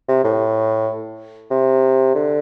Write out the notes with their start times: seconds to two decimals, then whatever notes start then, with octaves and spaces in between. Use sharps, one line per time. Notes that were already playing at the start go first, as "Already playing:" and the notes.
0.08 C3
0.24 A2
1.51 C3
2.15 D3